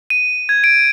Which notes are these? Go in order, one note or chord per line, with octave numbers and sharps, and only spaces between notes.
D#7
G#6
D7